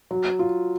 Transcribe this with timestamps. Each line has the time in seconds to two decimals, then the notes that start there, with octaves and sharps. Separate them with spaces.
0.11 F#3
0.39 F4